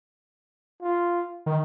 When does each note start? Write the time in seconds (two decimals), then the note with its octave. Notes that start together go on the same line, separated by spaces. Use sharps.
0.82 F4
1.46 D#3